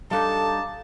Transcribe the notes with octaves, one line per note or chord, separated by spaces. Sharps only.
G3 D4 D#4 A4 F5 A5 A#5 D6